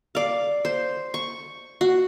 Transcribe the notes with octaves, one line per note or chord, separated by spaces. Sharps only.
D5 F5
C5
C#6
F#4